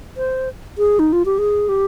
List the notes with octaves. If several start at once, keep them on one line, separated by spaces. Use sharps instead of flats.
C5
G#4
D#4
F4
G4
G#4
G4